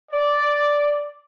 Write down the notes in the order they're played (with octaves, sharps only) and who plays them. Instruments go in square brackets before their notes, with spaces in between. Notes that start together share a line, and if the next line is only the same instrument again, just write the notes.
[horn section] D5